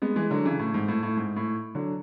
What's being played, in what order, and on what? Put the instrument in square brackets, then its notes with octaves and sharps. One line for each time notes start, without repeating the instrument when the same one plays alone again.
[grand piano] G#3 B3
E3 G#3
D3 F#3
C#3 E3
A2
G#2
A2
A2
G#2
A2
D3 F#3